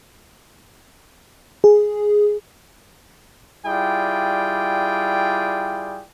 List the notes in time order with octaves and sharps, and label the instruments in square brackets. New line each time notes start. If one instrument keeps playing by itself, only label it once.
[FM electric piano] G#4
[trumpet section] G3 E4 F4 G#4 D5 G5